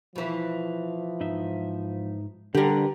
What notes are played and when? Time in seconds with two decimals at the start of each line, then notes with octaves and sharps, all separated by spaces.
0.16 B2 E3 F3
1.20 G#2 D#4 E5
2.55 D3 G3 G4 A#4 B4 F#5